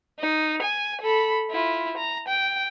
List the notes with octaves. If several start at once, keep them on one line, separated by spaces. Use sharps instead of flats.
D#4
G#5
A4 B5
E4 F4
A#5
G5